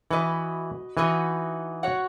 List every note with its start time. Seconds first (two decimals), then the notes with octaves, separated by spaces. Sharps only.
0.11 E3 F#4 B4 D#5
0.97 E3 D#4 F#4 B4 D#5
1.83 F#4 C#5 F#5